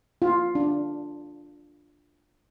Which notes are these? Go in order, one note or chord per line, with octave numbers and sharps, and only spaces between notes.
F4
D4